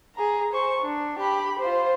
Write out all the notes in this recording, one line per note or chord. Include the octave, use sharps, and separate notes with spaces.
G#4 A#5
C5 C#6
D4
G4 B5
F4 C5